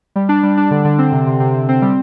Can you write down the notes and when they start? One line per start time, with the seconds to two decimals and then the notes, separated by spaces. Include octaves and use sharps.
0.16 G3
0.29 D4
0.43 G3
0.57 D4
0.71 D3
0.85 D3
0.99 C4
1.12 C3
1.27 C3
1.40 C3
1.55 C3
1.69 C4
1.82 G3